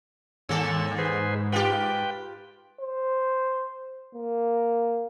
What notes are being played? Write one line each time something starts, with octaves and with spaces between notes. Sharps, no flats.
D#2 G#2 A#3 A4 C#5 E6
G#4 B4 C5
F4 G4 B4 G5
C5
A#3